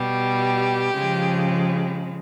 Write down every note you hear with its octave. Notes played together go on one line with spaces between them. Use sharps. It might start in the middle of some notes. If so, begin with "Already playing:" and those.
Already playing: B2 G3 G4
C#3 F3 G#3